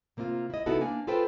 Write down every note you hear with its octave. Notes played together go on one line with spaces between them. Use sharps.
C3 A#3 C4 D#4 F4
E4 D#5
C3 B3 D#4 E4 F#4 A4
A#3 D4 G#5
F4 G#4 A4 B4 C5 G5